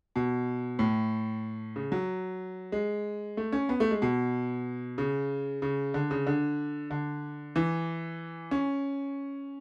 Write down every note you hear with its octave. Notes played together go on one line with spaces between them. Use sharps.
B2
A2
C#3
F#3
G#3
A3
C#4
B3
A3
G#3
B2
C#3
C#3
D3
C#3
D3
D3
E3
C#4